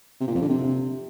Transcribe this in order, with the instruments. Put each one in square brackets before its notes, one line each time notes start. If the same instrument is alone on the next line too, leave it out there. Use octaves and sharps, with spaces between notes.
[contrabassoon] C3
A#2
F2
D3
C3